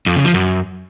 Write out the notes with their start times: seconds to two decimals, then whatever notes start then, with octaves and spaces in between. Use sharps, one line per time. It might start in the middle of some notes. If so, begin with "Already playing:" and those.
0.06 F2
0.16 C#3
0.25 F3
0.34 F#2